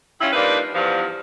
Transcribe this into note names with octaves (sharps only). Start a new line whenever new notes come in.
G3 C#4 E4 F4 C#5 E5
F3 G3 A#3 D4 D#4 B4
E2 G2 F3